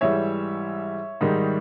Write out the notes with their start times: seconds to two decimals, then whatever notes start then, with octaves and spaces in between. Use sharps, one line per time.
0.01 G#2 E3 G3 C#5 E5
1.21 G#2 D#3 G3